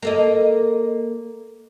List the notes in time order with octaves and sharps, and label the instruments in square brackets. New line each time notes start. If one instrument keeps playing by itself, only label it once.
[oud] A#3 A4 D#5